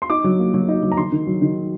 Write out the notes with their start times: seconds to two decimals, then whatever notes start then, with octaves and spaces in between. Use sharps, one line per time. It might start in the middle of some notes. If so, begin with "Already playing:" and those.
0.02 C6
0.10 D#4 D6
0.24 F#3
0.39 A#3
0.54 F#3
0.69 D#4
0.83 F#3
0.92 A#5
0.97 D#3 C6
1.12 D#3
1.27 F#3
1.42 D#3